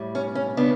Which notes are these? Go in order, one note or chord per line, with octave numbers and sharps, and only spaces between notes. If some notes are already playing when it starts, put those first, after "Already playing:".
Already playing: A2 G3
C#4
C#4
C#3 G3 B3 D4